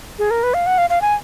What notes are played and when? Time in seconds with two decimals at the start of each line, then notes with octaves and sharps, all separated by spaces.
0.19 G#4
0.31 A#4
0.43 B4
0.54 F5
0.67 F#5
0.78 F5
0.90 F5
1.02 G#5